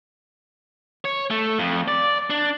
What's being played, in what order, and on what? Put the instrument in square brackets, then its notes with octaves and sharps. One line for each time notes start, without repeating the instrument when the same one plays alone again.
[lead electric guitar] C#5
A3
F2
D5
D4